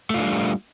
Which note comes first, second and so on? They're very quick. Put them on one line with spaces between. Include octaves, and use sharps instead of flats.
A3 F4 D4 G3